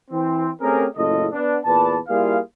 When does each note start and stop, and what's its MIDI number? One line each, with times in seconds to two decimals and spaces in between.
0.11 0.49 52
0.11 0.49 60
0.61 0.86 57
0.61 0.86 60
0.61 0.86 61
0.61 0.86 67
0.61 0.86 68
0.61 0.86 70
0.96 1.27 30
0.96 1.27 45
0.96 1.27 49
0.96 1.27 65
0.96 1.27 69
0.96 1.27 75
1.32 1.57 59
1.32 1.57 62
1.65 1.98 40
1.65 1.98 46
1.65 1.98 71
1.65 1.98 74
1.65 1.98 81
2.08 2.38 55
2.08 2.38 58
2.08 2.38 64
2.08 2.38 65
2.08 2.38 68
2.08 2.38 77